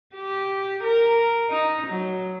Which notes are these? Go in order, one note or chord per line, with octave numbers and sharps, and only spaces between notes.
G4
A#4
D#4
F#3